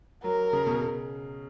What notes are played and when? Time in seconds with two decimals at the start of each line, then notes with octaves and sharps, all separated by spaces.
0.24 F#3 A#4
0.53 C#3
0.67 B2
0.81 C#3